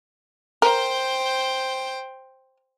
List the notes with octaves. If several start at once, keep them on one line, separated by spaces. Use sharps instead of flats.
A#4 C5 G5